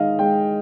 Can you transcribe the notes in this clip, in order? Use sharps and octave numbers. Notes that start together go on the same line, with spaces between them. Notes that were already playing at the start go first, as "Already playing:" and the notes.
Already playing: D#3 G#3 D#5 F5
G#3 G5